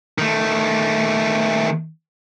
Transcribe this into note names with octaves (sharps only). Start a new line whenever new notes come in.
D#3 A3